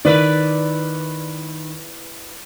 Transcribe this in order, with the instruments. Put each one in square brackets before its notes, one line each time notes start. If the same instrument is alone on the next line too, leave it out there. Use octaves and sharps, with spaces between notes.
[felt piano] D#3 [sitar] E4 B4 D5